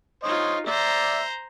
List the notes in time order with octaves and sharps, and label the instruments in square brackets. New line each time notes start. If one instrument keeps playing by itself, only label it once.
[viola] D#4 F4 [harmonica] C5 C#5 D#5
[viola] C5 A#5 [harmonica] D5 E5